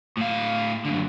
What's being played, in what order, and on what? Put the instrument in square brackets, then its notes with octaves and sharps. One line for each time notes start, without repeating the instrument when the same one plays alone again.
[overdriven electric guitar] A2 F5
F#2 D3